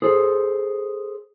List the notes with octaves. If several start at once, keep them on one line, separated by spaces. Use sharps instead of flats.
G#4 A4 C5